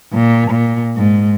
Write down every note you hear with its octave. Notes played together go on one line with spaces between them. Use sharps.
A#2
A#2
G#2